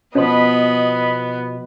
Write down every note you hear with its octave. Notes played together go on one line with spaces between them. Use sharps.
B2 F3 B3 C#4 C5 D#5 B5